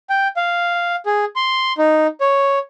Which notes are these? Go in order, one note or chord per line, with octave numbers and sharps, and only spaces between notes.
G5
F5
G#4
C6
D#4
C#5